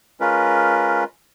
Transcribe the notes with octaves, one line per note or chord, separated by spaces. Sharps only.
G#3 C#4 F4 A#4 B4